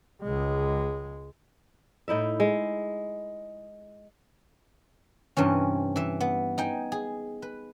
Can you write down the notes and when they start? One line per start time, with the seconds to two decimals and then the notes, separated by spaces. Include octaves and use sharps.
0.22 C#2 G#3
2.08 A2 D#4 E4 E5
2.40 G#3
5.37 G2 C3 E3 C#4
5.96 E3 E5
6.20 B3
6.58 D#4 G5 G#5
6.92 G#4
7.42 B4